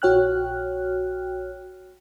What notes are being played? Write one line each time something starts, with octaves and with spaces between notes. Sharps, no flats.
A#1 F#4 C#5 G5 F6 F#6